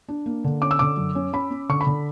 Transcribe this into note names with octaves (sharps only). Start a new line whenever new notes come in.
D4
A#3
D3
C#4 D6
E6
D3 D6
F#2
C#4
C#4 B5
C#4
D3 C#6
B5
D3